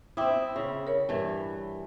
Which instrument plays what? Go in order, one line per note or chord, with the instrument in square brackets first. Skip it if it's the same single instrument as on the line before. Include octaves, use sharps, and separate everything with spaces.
[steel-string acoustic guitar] C4 E4 [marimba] G5 D6 D#6
[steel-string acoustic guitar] C#3
[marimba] A#4 C#5
[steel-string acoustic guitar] G2 E3